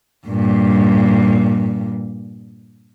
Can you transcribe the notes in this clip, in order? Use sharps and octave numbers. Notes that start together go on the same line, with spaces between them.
G2 A#2